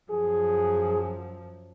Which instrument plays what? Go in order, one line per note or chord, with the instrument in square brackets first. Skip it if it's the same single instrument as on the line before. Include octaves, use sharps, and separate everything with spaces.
[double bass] F#2 F3 [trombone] G#4